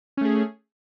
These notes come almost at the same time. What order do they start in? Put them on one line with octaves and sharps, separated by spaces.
C#4 A3 G#4